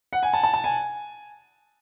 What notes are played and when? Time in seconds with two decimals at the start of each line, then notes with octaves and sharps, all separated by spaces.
0.13 F#5
0.23 G#5
0.33 A5
0.44 A5
0.54 A5
0.64 G#5